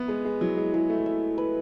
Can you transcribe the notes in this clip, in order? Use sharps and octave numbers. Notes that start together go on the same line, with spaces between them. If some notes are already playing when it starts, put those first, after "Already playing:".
Already playing: B3 E5
G#3 B4
G#3
F#3 E4
G#3
G#3 E4
A3
E5
B4